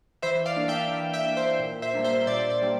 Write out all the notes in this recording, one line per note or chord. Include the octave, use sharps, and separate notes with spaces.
E3 C5 E5
D5 F5
A#3 D4
E5 G5
E3
E5 G5
A#3 D4
C5 E5
A#2
C5 E5
G3 A#3 D4
C5 E5
A#2 D5
D5
G3 A#3 D4